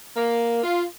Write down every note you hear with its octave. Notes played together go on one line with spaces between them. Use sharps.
A#3
F4